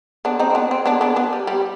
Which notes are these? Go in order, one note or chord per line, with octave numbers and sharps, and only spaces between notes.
B3 D4
C4 D#4
C4
B3 D4
C4
B3 D4
B3 D4
B3 D4
G3
G3